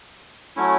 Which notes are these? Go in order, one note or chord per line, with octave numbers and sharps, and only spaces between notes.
F#3 A3 C#4 E4